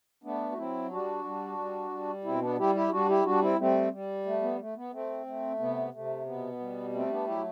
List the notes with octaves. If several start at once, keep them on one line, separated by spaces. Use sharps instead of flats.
A3 B3 D4
F#4
F#3 C4 E4
G3 D4 F#4
G3
G3
G3
B2 C4 E4
B3 D4
G3 E4 G4
E4 G4
G3 D4 F#4
E4 G4
G3 D4 F#4
C4 E4
G3 A3 C4
G3
A3
B3
A3
B3
A3 C4
A3
C3 B3
C3 A3
B2 B3
G3
A3 C4
B3 D4
F#3 E4 G4